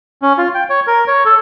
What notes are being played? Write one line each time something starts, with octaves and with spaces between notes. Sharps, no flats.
C#4
F4
G5
C#5
A#4
C#5
A4